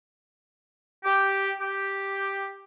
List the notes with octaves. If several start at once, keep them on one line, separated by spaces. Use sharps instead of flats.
G4
G4